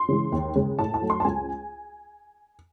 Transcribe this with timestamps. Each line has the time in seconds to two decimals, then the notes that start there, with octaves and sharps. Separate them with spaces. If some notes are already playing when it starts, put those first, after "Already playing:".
Already playing: C6
0.08 C#3 E3 G#3
0.32 D#2
0.55 C#3 G#3
0.79 A2 A5
0.94 A5
1.02 F#3 A3
1.10 C6
1.20 A5
1.25 C#2 G#5